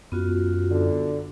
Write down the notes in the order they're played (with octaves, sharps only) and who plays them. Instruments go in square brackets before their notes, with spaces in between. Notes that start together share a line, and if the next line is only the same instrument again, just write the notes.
[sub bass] F#2 [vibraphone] B3 F4 F#4
[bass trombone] D3